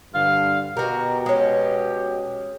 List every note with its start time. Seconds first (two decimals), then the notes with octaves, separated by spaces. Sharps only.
0.14 G2 D3 F5
0.77 B2 F#4 G4 A#4
1.26 G#3 C#4